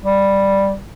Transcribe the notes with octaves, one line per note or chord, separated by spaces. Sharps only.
G3